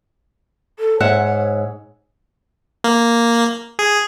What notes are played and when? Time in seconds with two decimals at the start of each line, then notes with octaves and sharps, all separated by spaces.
0.79 A4
1.00 G#2 C#5 E5 F#5
2.84 A#3
3.79 G#4